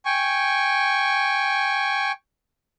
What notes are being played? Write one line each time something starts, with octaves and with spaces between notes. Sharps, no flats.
G5 G#5 C#6